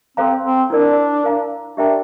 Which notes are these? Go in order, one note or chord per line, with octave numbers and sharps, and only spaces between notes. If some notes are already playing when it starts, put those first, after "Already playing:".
C4 A4 C5 F5 A#5
C4
D4 E4 A#4 D5
A#4 F5 A#5
D4 G4 A#4 E5 G5 A#5